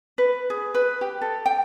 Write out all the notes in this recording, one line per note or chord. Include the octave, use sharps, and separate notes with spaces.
B4
G#4
B4
G4
A4
G5